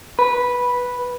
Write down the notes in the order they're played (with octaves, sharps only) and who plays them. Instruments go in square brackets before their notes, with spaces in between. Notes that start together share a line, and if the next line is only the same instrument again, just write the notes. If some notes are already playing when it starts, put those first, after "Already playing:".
[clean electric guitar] B4